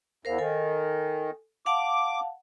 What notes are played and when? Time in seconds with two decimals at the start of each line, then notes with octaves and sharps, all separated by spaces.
0.25 E2 A#4 C5 F5
0.38 D#3 A4 G#5
1.66 F5 F#5 A5 D6